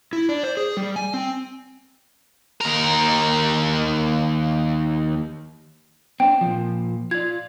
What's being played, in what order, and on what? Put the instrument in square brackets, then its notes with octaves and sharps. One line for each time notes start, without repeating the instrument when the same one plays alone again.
[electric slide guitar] E4
D4
C5
G#4
G3
G#5
C4
[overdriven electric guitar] D#2 A#4
[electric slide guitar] C4 D4 [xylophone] G5
[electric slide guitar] A#2 F3
[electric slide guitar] F4 D5 [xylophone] G#6